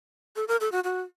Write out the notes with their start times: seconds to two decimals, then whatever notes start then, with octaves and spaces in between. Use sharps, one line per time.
0.36 A4
0.48 A#4
0.60 A4
0.72 F#4
0.84 F#4